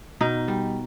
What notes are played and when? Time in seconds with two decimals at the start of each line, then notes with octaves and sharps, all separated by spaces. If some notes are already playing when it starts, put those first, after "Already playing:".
0.21 B2 D#4
0.48 G3